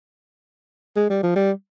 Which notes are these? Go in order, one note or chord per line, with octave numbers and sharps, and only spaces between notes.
G#3
G3
F3
G3